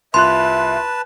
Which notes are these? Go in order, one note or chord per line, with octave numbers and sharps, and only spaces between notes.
C2 F4 B4 E5 A5 C6 F#6